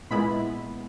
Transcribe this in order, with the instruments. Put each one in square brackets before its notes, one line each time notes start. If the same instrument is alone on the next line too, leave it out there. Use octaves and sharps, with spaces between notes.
[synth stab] A#2 G#3 B3 E4 B5